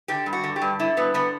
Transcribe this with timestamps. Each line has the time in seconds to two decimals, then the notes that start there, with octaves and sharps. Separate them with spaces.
0.08 D3 G4
0.26 G2
0.33 F#4
0.44 D3
0.56 G4
0.61 G2
0.80 D3 E4
0.97 G2 B3
1.14 D3 B3